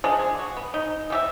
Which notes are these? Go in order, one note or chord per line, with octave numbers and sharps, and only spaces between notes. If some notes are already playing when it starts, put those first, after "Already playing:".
F3 G#3 D4
G#4
F#4
B3
D#4
E3 G4 E5